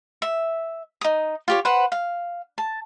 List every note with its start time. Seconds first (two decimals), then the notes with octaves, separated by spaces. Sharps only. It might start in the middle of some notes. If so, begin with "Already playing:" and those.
0.22 E5
1.01 D#4 D#6
1.48 F4 G4 C#5
1.65 B4 C5 F#5
1.92 F5
2.58 A5